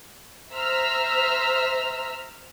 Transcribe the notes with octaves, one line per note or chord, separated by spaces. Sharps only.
C5 E5 A#5 E6 F6 B6